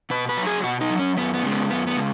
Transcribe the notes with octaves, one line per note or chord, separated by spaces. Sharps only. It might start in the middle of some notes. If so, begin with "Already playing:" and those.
B2 B4
B4
F#3
G#4
B2 F#4
D#4
F#3
C#4
F#2 B3
B3
C#3 G#3
B3
F#2 B3
B3
C#3 G#3